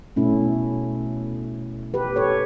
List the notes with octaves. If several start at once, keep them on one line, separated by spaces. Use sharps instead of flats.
B2 A3 C#4 E4
G4 B4
A4 C#5